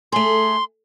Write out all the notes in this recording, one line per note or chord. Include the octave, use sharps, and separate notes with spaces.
A3 G#4 C6